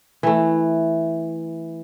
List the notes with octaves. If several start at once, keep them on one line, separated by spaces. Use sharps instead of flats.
E3 A3